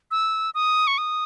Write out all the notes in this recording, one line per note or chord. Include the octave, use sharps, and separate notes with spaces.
E6
D#6
C#6
D#6